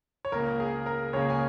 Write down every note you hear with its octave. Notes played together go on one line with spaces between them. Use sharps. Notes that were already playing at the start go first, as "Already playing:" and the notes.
C#5
C#2 C#3 A#3 A#4
G#4
A#4
C#2 C#3 A#3 G#4 C#5
G#5